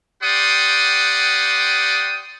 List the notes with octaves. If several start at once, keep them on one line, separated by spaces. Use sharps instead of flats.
G4 D5 F#5 G5 C6 D#6